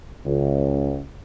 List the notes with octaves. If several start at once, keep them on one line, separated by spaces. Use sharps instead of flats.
C#2